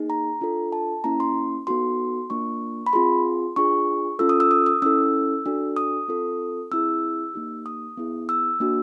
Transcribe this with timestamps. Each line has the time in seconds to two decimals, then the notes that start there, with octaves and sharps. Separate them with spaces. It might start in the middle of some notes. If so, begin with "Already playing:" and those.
Already playing: A#3 D#4 G#4
0.10 A#5
0.41 D4 F4 A4
0.72 A5
1.04 A#3 C#4 E4 A#5
1.20 C6
1.67 B3 D#4 F#4 A4 C6
2.30 A#3 D4 F4 C#6
2.86 B5
2.93 C4 F4 G#4 C6
3.56 D4 F4 G#4 C#6
4.19 C#4 F4 A4 E6
4.29 D#6
4.40 E6
4.51 D#6
4.66 D#6
4.82 C#4 E4 A4 E6
5.46 D4 F#4 A4
5.76 D#6
6.08 C4 F4 A4
6.71 C4 E4 G#4 E6
7.34 A#3 D#4 G4
7.66 D#6
7.97 B3 E4 G#4
8.29 E6
8.60 A#3 D4 F#4